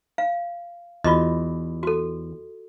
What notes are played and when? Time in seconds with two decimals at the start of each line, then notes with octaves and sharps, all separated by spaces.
0.18 F5
1.04 E2 F4 F#4 D#5
1.83 F#4 A4